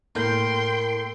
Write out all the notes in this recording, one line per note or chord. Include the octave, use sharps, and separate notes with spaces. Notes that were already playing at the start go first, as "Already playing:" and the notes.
A2 A#3 G5 C6 G6